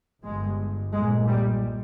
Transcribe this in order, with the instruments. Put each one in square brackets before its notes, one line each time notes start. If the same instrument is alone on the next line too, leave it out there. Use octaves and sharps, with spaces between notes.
[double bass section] G1 G2 G#3
B1 A#2 G#3
G3